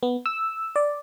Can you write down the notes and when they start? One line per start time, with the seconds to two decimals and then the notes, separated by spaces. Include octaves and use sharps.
0.03 B3
0.26 E6
0.76 D5